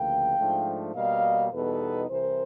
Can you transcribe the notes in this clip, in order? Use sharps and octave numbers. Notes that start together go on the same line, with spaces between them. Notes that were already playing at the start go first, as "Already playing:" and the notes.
Already playing: D2 C#3 F3 A#3 F5 G5
G#2 F3 A3 D4
B2 G3 A#3 D#5 F5
E2 B2 G3 B3 D#4 A4 B4
C2 C3 E3 A#4 C5